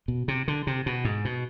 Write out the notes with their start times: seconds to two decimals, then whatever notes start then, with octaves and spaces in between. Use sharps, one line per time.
0.08 B2
0.28 C3
0.48 D3
0.67 C3
0.86 B2
1.05 G#2
1.25 B2